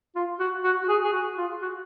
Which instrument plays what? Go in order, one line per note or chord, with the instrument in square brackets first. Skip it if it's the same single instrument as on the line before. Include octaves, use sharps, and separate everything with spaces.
[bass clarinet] F4
F#4
F#4
F#4
G#4
G#4
F#4
F4
F#4